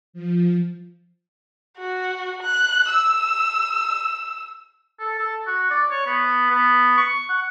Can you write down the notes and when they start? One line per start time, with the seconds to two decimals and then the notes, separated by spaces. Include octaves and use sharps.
0.13 F3
1.78 F#4
2.43 F#6
2.91 E6
4.99 A4
5.18 A4
5.47 F#4
5.71 D5
5.91 C#5
6.06 B3
6.50 B3
6.97 C#6
7.29 F#5